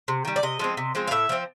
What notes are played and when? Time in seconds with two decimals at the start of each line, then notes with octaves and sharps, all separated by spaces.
0.08 C3
0.25 D#3 G3
0.36 D5
0.43 C3 D#5
0.59 F3 G#3 C4
0.77 C3
0.95 F3 G#3 C4
1.08 F5
1.11 A2 E5
1.29 F3 A3 C4